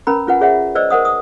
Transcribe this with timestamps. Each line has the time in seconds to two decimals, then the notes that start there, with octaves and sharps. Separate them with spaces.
0.07 C#4 A#4 B4 A#5 B5
0.27 C#4 F4 B4 F#5 G#5
0.41 G#4 C#5 E5 F#5
0.75 B4 C5 D5 D#5 E6
0.90 A#4 C5 F#5 D#6
1.05 D#6